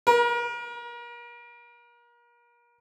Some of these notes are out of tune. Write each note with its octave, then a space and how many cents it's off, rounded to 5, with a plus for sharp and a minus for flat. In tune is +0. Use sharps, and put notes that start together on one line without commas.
A#4 +35